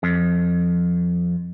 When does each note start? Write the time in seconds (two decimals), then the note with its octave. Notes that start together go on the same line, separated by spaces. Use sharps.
0.03 F2